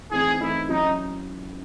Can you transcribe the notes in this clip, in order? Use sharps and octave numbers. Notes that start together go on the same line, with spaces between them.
E3 A3 C4 D#4 G#4
E3 A3 C4 D#4 E4
F#3 C#4 D#4 E4